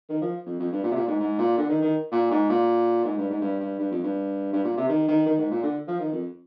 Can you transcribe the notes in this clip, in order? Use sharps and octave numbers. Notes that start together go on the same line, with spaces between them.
D#3
F3
F2
F2
G2
A#2
C3
A#2
G#2
G#2
A#2
D3
D#3
D#3
A#2
G#2
A#2
G#2
G2
G#2
G2
G2
G2
F2
G2
G2
A#2
C3
D#3
D#3
D#3
G#2
A#2
D3
F3
D#3
F2